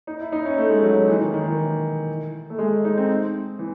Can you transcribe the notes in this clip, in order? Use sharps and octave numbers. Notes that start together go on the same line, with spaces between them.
D#4
E4
D#4
C#4
A3
G#3
F#3
F#3
E3
D#3
D#3
E3
A3
G#3
D#4
C4
E3